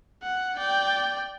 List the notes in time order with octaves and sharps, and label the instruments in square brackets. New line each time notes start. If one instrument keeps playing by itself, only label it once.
[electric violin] F#5
D5 G5